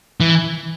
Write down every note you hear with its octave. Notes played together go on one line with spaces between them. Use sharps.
E3